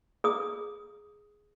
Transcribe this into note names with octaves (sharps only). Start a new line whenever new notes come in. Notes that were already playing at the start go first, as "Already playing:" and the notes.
G#4 D#6